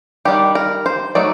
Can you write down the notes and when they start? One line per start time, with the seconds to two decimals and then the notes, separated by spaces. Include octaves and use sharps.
0.25 D#3 G3 D4 G4
0.55 A#4
0.86 C5
1.15 F#3 A3 D#4 D5